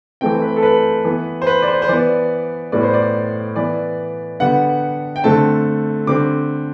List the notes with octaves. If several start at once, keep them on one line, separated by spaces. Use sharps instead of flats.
E3 A3 C4 G5
B4
A4
B4
E3 B3
C5
B4
D5
C5
C5
E3 B3 D5
A2 G3 B3 D5
C5
D5
E3 B3 D5
D3 G3 B3 F#5
G5
D3 A3 C4 A5
D3 G3 C4 D6